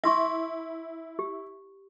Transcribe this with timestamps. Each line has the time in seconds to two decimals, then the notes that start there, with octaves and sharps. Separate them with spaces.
0.04 E4 E5 C6 C#6
1.19 G4